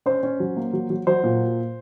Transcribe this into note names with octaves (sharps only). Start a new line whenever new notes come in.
C#4 C5
C#4
F#3
A#3
F#3
F#3
F#3 C5
A#2